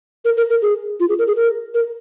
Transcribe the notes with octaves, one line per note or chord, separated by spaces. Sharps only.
A#4
A#4
A#4
G#4
F4
G#4
A#4
G#4
A#4
A#4